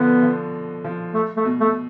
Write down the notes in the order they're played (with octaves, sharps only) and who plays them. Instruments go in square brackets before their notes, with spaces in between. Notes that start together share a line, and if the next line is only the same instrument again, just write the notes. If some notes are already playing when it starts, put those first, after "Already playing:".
Already playing: [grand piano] B2 D3 F3 [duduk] B3
[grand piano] F3
F3
[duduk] A3
A3
[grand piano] B2
[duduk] A3